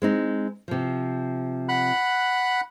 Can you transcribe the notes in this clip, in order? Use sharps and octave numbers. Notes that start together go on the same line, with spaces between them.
G#3 C4 D#4
C3 F3
F#5 B5 F#6